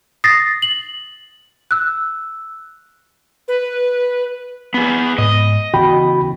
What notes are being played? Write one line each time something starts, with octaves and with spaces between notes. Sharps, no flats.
D#6 A6 A#6 C7
F#7
E6 F#6
B4
B3 G#4
G#2 D#5
C#3 E3 B3 F#4 G5 B5